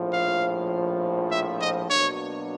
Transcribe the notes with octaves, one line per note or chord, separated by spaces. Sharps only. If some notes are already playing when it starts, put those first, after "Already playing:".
Already playing: A#1 A2 F3
F5
E5
D#5
B2 F#3 A#3 D4 C#5